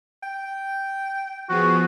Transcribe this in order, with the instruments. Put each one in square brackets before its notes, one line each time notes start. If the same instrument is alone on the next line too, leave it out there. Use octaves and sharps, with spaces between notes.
[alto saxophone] G5
[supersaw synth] F3 B3 G#4 [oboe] F#4